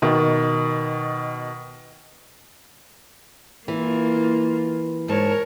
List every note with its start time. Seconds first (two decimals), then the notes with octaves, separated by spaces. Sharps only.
0.02 B2 D#3
3.68 E3 A#3 F4
5.08 G#2 A#4 C#5 A5